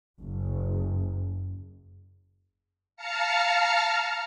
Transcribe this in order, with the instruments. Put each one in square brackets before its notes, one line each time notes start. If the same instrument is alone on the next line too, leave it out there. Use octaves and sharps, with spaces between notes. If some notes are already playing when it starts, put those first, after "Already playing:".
[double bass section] F#1
[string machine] F5 A5 A#5 F6 C#7